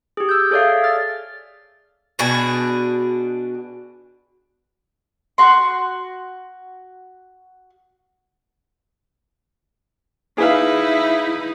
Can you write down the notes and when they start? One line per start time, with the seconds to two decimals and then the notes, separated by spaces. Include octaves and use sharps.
0.17 G4 G#4
0.29 E6 G6
0.51 G#4 A4 C#5 D5 E5 F5
0.84 F6 A6
2.19 B2 D4 F#4 G#4
5.38 F#4 C6
10.38 D#4 E4 G#4 B4 F5